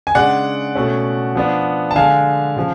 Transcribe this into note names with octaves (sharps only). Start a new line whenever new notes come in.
G#5
C#3 G#3 D4 D5 F#5
B2 A3 C#4
F3 B3 D4
A5
D3 G#3 D4 F5 G#5
C#3 F3